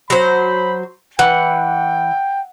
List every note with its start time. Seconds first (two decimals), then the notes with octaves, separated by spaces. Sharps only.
0.10 F#3 C5 B5
1.19 E3 F#5 G5